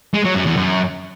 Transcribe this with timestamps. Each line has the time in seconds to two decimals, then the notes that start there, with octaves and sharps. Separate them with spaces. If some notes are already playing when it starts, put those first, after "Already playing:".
0.14 G#3
0.25 F#3
0.35 F#2
0.46 E2
0.57 F#2